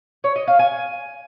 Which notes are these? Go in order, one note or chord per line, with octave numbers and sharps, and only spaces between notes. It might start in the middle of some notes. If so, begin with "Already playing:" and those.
C#5
D#5
F5
G#5